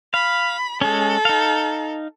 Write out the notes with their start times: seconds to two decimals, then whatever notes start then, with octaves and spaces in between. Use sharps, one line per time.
0.14 F5 B5
0.81 G#3 C#4 A4
1.25 D#4 F5